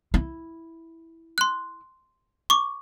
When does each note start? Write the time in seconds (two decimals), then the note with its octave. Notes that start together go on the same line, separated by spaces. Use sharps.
0.14 E4
1.38 C6 F#6
2.50 C#6 D6